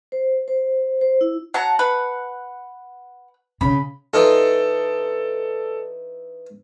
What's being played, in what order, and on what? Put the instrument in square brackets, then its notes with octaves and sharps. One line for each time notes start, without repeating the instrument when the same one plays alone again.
[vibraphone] C5
C5
C5
E4
[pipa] F#3 [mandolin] F#5 A5 A#5
[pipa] B4 [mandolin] F#5
[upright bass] C#3 [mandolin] B5
[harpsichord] E3 D#4 F4 [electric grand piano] A4 D5